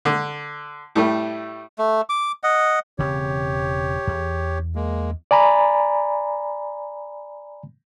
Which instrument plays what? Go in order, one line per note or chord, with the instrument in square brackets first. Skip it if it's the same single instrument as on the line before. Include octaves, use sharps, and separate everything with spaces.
[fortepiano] D3
A2 G3 A3
[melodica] A3
D6
D#5 F#5
[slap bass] E1 C#3 C4 [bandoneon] G4 C#5
[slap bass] E2
[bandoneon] G#3 A#3
[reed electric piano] D5 G#5 A#5 B5